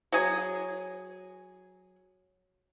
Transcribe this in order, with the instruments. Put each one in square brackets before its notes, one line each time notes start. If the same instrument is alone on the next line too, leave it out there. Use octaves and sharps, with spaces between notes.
[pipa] F#3 G#4